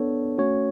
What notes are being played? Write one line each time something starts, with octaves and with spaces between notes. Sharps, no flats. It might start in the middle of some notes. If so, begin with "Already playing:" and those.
Already playing: B3 D4 A4 C#5
A3 C#4 F#4 C#5